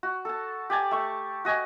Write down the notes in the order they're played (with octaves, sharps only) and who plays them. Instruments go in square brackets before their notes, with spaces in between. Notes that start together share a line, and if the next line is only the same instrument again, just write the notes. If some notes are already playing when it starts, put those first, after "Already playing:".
[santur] F#4
A4 A5
G4 D5 G#5 A5
A3 C#6
F#4 D#5 G#5